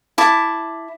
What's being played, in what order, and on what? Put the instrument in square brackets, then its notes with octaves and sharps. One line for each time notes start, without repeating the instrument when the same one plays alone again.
[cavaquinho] E4 A5 D6